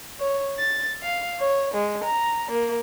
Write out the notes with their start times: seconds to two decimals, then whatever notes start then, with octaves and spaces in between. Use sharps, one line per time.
0.20 C#5
0.58 A6
1.03 F5
1.39 C#5
1.73 G#3
2.04 A#5
2.50 A#3